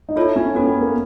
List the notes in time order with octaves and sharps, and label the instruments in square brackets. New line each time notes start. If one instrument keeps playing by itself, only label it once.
[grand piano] D#4
[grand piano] E4 [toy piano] F4 A4 C#5 E5 A5
[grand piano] C#4
[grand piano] B3 [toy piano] C#4 F#4 A4
[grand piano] B3
A#3